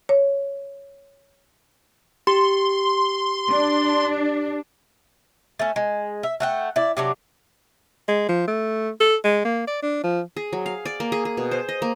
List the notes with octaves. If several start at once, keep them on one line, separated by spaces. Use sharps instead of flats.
C#5
G4 C6
D4
A3 C#4
G#3
E5
A3 F#5 G5
E4 D5
C3 F#3 D4
G#3
F3
A3
A4
G#3
A#3
D5
D4
F3
G#4
F#3
F5
D5
A#3
G#4
G#4
B2
C5
D#5
A#3